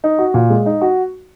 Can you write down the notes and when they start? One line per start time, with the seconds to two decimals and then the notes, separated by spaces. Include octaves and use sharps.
0.04 D#4
0.19 F#4
0.34 A#2
0.50 G#3
0.66 D#4
0.82 F#4